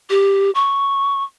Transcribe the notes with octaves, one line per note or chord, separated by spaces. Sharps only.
G4
C#6